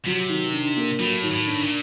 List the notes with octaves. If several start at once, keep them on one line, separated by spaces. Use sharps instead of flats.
C3 F#3
D#3
D4
A#3
A2 F#3
D#3
A2
D4
A#2